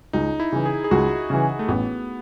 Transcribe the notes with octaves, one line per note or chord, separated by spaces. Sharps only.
C#2 D#4
E4
C#3 E3
G#4
G#4
C#2 F#4
C#3 E3
A3
A1 B3